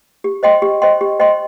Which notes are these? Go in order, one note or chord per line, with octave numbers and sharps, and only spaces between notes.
G4
C5 D#5 G5 C6
G4
C5 D#5 G5 C6
G4
C5 D#5 G5 C6